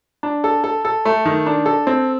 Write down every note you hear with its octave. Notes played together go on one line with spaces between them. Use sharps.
D4
A4
A4
A4
A3
D#3
D4
A4
C4